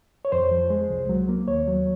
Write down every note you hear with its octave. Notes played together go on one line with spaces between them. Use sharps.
C#5
F2 C5
F3
G#3
C2
F#3
A#3
D#2 C#5
F#3